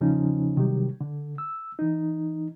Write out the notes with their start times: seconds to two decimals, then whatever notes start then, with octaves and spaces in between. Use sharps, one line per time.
0.01 E2 C#3 F3 C#4 D#4
0.56 C3 D#3 F#3 G3 G4
1.01 D3
1.38 E6
1.79 E3 D#4